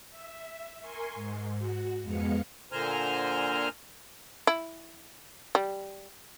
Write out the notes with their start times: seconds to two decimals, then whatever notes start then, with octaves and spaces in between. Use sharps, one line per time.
0.11 E5
0.81 A#4 G#5 C6 C#6
1.15 G#2
1.58 F#4
2.02 F2 G#3 B3 F5 F6 C#7
2.72 A#2 D3 C5 G#5 A#5 F6
4.47 E4
5.55 G3